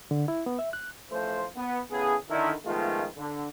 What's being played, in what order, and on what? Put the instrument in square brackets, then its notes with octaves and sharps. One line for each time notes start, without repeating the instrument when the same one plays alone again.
[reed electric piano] D3
E4
B3
E5
F#6
[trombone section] A1 F3 A3 C5
B3
A2 C#3 B3 G#4
D3 D#3 E4
D#3 F3 G#3 A3 B3 F4
D3